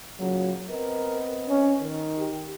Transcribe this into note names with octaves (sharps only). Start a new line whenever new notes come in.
A#2 C#3 F#3
B3 C4 A#4 D#5
C#4
D#3
G4